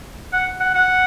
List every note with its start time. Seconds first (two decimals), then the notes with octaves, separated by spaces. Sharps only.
0.33 F#5
0.60 F#5
0.75 F#5